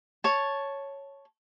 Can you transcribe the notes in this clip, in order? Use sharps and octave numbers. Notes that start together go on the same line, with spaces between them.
C#5 A5